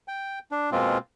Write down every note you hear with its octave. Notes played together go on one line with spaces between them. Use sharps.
G5
D4
B2 G#3 A#3 C4 F4